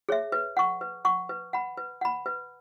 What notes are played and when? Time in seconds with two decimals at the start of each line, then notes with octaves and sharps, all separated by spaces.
0.09 G#4 C#5 E5
0.32 B4
0.57 F#5 C#6
0.81 B4
1.05 F#5 C#6
1.29 B4
1.53 F#5 B5
1.77 B4
2.01 F#5 B5
2.26 B4